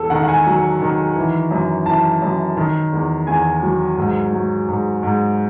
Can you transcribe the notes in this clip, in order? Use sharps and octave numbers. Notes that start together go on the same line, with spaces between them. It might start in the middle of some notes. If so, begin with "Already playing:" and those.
Already playing: E2 A4
D#3 F#5
F#5
G#5
F#3
D#3
E3
F#2
E3 A5
F#2
D#3
E2
E2 G#5
F#3
G#2
F#3
G#2
G#2